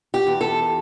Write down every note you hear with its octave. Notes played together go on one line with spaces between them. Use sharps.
G4
E2
A4